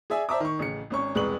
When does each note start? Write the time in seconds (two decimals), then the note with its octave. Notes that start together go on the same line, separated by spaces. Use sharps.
0.10 G#4 D5 E5 G#5
0.29 C5 D5 E5 A5 A#5 D6
0.40 D#3 C#6
0.59 A1 C#3 C#7
0.90 G#1 C#4 C#6
1.15 E1 C2 G#3 B4 C#6 F#7